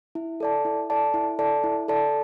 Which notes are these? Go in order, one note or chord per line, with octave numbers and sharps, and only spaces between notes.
E4
A4 D5 A5
E4
A4 D5 A5
E4
A4 D5 A5
E4
A4 D5 A5